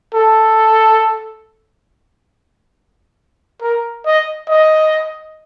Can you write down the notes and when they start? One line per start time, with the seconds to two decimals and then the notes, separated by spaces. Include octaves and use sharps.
0.14 A4
3.62 A#4
4.06 D#5
4.49 D#5